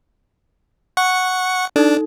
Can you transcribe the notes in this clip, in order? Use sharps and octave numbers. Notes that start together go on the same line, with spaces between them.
F#5 C#6
D4 D#4 A4